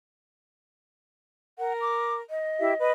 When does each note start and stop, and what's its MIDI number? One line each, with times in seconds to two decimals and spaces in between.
1.58 2.20 70
1.58 1.73 78
1.81 2.14 86
2.30 2.79 75
2.59 2.72 64
2.59 2.72 67
2.59 2.72 76
2.79 2.92 71
2.79 2.92 75